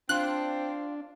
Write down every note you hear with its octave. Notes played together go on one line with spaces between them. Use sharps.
C4 D4 F4 F#6